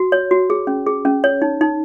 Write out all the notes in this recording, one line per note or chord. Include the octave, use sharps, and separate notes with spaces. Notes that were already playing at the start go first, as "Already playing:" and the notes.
Already playing: F#4
C#5
F#4
G#4
C#4
G#4
C#4
C#5
D#4
D#4